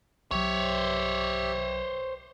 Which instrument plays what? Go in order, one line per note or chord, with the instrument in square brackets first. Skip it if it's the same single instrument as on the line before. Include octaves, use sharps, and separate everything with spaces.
[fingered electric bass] B1 F#3 [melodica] G4 E5 [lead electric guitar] C5 C#5